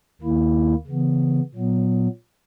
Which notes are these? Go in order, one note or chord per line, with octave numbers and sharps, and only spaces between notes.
D#2 D#3 A#3 E4
C#3 E3 B3
A#2 F#3 B3